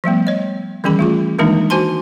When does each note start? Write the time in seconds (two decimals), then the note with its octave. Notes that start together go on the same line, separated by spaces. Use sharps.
0.04 F3 G3 A3 B3
0.27 C#5 D#5
0.84 D#3 E3 G3 C#4 G#4 B5
0.99 A3 F4 G#4
1.39 D#3 E3 G#3 A#3 D4 D#4
1.70 F#4 C5 G#5 A5 C6